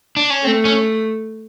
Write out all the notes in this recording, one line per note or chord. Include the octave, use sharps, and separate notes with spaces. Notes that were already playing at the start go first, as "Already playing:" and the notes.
D4
C#4
A3 C4
C#4